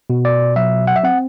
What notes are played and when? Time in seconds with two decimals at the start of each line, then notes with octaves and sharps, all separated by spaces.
0.10 B2
0.25 D5
0.56 F#3 E5
0.87 F#5
0.96 E5
1.03 C4 F#5